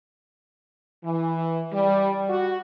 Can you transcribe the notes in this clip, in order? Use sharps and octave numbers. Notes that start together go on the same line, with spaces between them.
E3
G3
F#4